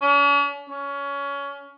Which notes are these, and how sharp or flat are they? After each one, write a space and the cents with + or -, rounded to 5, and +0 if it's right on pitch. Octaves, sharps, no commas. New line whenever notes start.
C#4 +45
C#4 +20